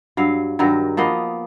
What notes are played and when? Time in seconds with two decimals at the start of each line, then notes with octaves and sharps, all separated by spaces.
0.17 G2 F#3 F5
0.59 G2 D#3 F#3 A#4
0.97 F3 A#3 B3 D#5